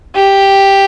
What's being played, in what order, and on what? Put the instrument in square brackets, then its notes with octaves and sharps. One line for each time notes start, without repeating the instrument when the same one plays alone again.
[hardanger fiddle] G4